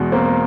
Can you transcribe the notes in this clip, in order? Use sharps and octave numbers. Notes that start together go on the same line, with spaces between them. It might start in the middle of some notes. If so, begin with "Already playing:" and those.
Already playing: E2 B2 G#3
A#3 C4